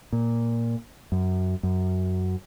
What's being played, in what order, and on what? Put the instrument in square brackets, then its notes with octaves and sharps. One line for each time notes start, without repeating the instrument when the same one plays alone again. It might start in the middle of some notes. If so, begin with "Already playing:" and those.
[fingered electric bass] A#2
F#2
F#2